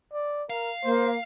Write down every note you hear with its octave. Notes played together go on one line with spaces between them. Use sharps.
D5
A#4 F5
A#3 C5